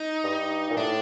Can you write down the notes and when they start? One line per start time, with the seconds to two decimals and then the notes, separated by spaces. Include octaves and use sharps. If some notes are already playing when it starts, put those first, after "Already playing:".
Already playing: D#4
0.24 G2
0.70 A#2
0.77 A2 D4